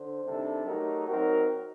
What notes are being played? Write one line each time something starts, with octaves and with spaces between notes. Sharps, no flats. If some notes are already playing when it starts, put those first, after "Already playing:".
Already playing: D3 C5
C3 D#3 G3 D4 A4
F#3 A3 D#4 G4 A#4
F#3 C4 D#4 F#4 A#4